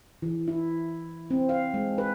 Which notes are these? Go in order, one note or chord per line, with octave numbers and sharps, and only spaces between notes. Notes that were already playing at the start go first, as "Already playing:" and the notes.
E3
E4
C4
F5
G#3
B4